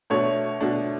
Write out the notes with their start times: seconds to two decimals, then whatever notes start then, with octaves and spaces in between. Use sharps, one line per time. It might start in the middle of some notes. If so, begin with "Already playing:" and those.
0.10 B2 A3 D4 C#5
0.61 B2 A3 D4